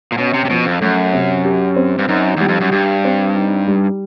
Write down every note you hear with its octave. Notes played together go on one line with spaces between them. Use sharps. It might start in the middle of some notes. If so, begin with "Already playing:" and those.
A#2
B2 C#4
C3
C3
B2 F3
F2
F#2 A3
C3
G4
C4
G2
F#2 D#4
E2 G3
F2
F#2
G2 G4
C4
D#4
G3